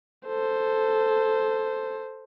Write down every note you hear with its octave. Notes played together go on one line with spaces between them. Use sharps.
A4 C5